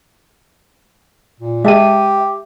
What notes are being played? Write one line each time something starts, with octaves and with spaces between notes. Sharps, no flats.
A#2
G#3 G4 E5 A5 D#7